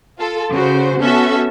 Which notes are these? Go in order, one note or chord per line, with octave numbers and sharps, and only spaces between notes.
F4 A4
C#3 F#4 C5
B3 C#4 F#4 A4 E5